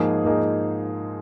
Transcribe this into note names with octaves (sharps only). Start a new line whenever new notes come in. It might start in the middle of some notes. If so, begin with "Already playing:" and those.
Already playing: G#2 F3 A#3 D#4 G#4
G#2 F3 A#3 D#4 G#4